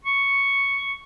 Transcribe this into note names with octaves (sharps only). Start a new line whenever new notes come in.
C#6